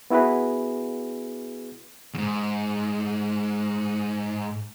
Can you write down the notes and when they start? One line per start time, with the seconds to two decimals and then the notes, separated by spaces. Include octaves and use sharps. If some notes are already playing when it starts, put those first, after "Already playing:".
0.10 B3 E4 F#4 G#4 B4
2.14 E2 G#2